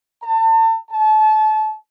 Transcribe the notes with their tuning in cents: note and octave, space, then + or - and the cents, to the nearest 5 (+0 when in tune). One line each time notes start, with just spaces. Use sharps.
A5 +35
A5 -30